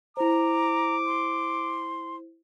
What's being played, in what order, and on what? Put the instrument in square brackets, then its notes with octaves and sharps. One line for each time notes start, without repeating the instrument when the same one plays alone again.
[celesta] E4 C5 [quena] A#5 [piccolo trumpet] D6
[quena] C6